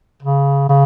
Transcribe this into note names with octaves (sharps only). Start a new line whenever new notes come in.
C#3
C#3